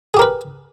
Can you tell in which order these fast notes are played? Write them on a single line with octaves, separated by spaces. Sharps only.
G#4 G4 A#4 B4